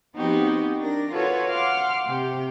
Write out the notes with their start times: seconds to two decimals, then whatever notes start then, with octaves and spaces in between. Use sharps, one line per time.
0.15 F3 B3 C4 D#4 F#4 G4
0.79 D4 A#4 A#6
1.12 F4 F#4 A4 B4 C#5
1.49 F5 F#5 C6 D6 F6
2.06 C3 G4